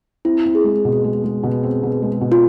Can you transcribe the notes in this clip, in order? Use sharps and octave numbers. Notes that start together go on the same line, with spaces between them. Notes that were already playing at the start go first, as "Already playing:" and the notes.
C4 E4
C4
G#4
G#3
B2
G#3
G#3
B2
C4
B2
G#3
B2
F4